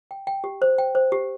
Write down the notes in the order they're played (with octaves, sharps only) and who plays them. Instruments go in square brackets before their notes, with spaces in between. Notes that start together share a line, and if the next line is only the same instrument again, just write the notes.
[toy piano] G5
G5
G4
C5
G5
C5
G4